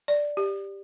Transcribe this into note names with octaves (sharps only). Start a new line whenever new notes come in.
D5
G4